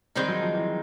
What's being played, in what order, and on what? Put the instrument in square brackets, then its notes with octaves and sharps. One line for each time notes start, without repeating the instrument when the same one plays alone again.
[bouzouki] D#3 G#3 C4 D#4 [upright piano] G3
[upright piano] F#3
F3
E3